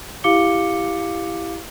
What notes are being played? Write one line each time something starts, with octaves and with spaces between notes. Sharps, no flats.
E4 G4 F5 D6 C#7 G7